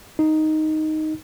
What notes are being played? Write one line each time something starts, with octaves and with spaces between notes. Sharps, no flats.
D#4